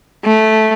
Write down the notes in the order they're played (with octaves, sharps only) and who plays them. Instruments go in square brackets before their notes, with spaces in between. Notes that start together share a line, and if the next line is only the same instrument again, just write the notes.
[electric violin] A3